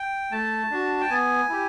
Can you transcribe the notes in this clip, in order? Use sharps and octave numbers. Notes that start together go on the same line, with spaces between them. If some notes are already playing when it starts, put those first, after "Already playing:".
Already playing: G5
A3 A5
D4 F#4
G5
B3 G#5
E4 G4